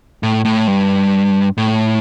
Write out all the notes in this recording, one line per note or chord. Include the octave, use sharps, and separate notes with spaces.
A2
A2
G2
A2